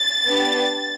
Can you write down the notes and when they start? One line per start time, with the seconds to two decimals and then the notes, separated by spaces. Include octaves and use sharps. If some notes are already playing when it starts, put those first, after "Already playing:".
Already playing: A6
0.27 B3 D4 G4